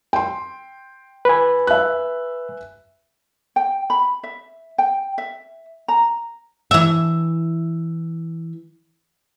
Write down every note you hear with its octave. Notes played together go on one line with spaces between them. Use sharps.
G5 C6
B4 G#5
E5 F#6
G5
B5
E5
G5
E5
A#5
E3 E5